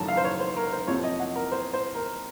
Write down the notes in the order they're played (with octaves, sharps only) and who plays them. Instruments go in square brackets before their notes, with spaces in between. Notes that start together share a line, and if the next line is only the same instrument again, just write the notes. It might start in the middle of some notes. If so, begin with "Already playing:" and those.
Already playing: [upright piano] F#1 F#2 D#3 F#3 A3 A5 A#5
F5
C5
C#5
C5
A#4
C5
F2 C3 F3 C4 C#5
D#5
F#5
A#4
C5
C5
A#4